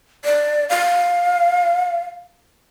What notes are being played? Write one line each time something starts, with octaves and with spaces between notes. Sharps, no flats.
D5
F5